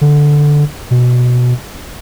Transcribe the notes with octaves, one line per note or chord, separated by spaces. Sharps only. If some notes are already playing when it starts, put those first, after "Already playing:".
D3
B2